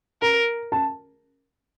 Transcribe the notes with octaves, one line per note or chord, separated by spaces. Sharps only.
A#4 A#5
A5